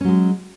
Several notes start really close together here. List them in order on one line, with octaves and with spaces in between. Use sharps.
C#4 F#3 G#3